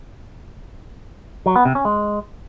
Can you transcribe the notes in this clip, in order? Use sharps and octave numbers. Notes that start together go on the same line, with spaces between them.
F#3
B3
C3
C#4
G#3